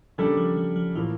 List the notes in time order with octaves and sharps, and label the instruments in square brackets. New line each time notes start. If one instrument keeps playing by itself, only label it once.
[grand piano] C#3 G3 A#3 D4 A4 [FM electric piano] F3
[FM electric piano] F3
F3
F3
[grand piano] A2 F3 A#3 [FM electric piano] E3